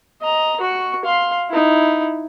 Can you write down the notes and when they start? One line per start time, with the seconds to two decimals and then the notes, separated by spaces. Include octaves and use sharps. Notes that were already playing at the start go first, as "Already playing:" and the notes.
0.21 D#5 A#5
0.61 F#4 C#6
1.05 F5 C6
1.50 D#4 E4